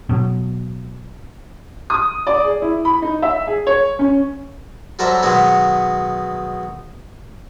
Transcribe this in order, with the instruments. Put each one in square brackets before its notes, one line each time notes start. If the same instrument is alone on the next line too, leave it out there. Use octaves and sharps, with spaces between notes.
[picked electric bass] B2 F#3
[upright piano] D#6
D5
G#4
E4
B5
D#4
E5
G#4
C#5
C#4
[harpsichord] F#3 G3 A4 A#4 C5 E5
B2 D#3 F#3 G#3 B3